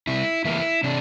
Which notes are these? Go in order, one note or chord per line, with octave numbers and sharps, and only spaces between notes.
C3 E4
E3 A#3 E4
C3 D4